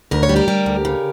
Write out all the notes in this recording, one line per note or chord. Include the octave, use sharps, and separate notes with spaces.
D2 A#4
C#5
G3
G4 A#4
G3
D2
C#3